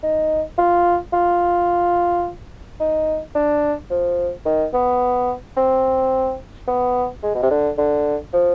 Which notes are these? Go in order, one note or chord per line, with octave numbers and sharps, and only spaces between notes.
D#4
F4
F4
D#4
D4
F3
D#3
B3
C4
B3
G#3
B2
C3
D3
D3
F3